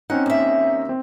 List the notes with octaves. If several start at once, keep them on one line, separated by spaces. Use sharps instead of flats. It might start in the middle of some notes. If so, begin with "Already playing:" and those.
C4 C#4 D#4 F#5
D#2 E5
C4